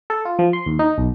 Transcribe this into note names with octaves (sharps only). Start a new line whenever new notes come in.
A4
F4
F3
C6
D#2
D#4
B1